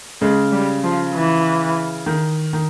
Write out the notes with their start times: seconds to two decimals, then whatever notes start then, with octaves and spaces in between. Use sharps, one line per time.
0.21 C#3 G#3
0.52 G3
0.83 F3
1.14 E3
2.06 D#3
2.53 D#3